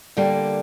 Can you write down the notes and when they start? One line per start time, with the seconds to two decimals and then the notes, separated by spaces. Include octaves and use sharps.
0.17 D3 G3 A#3